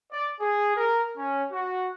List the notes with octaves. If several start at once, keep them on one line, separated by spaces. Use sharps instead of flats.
D5
G#4
A#4
C#4
F#4